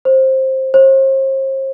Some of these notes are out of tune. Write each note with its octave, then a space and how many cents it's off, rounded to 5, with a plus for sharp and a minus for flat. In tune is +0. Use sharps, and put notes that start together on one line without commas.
C5 +15
C5 +40